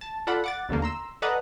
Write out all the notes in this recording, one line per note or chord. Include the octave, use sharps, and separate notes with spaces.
A5
F4 A4 D5 F#5 B5
F#5 D6 A6
D#2 B2 D3 A3 A#3
A#5 C6 E6
A4 B4 D5 D#5 F#5 A#5